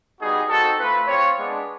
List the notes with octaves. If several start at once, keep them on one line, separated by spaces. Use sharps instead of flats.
G3 B3 D#4 F#4 G#4
C4 D#4 F#4 A4
A3 C4 F4 B4
C4 F4 C#5
G#3 B3 D4